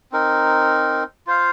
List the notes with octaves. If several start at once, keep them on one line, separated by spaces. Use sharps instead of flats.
C4 D#4 A#4
F4 C5 F5